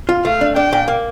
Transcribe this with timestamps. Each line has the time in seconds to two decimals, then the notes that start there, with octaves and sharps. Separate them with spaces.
0.09 F4
0.25 A3 F5
0.41 D4
0.56 D4 G5
0.72 A#2
0.88 A#3